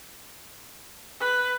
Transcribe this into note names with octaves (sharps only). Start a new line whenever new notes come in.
B4